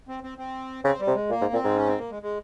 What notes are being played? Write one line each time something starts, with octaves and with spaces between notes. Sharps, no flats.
C4
C4
C4
C#3 C4
G3
C3
G#3
A#2 A#3
G#2
A#2 C4
G#2
C#4
C4
A#3
G#3
G#3